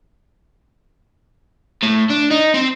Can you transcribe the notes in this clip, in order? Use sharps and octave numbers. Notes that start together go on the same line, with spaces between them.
A2
D4
D#4
C4